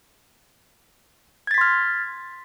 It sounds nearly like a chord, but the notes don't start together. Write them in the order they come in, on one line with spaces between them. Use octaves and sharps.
G#6 A6 B6 C6 F6